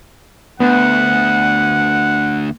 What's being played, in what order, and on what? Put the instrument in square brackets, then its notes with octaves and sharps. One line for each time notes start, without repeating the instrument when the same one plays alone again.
[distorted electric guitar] D2 [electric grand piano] B3 [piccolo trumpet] F#5